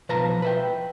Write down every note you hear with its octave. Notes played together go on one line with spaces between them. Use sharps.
B1 F3 B4 F5 A5 A#5
B4 E5 G5